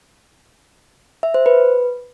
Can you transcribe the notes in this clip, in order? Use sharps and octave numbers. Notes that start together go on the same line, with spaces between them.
E5
C5
B4